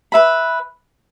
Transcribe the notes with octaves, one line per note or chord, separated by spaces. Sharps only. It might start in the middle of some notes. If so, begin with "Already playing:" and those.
B4 E5 B5